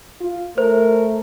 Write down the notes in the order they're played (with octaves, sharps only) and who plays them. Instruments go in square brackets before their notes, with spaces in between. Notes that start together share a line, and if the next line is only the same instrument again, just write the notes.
[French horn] F4
[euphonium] A3 [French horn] A#4 [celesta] C5